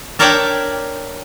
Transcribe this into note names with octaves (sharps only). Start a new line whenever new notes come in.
D4 A#4 C#5 D5 E5 G5